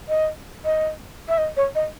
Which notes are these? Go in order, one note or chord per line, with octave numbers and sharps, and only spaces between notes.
D#5
D#5
E5
D#5
C#5
D#5